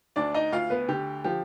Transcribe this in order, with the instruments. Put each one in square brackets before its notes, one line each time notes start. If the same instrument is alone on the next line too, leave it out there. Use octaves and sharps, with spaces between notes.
[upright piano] D2 D4 D5
D#4 D#5
D2 F4 F5
B3 B4
D3 G4
F3 G4